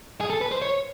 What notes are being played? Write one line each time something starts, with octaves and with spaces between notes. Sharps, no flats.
G#4
A4
B4
C5
C#5